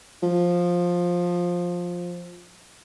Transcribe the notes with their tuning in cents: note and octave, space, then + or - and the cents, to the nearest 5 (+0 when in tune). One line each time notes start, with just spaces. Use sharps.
F3 +10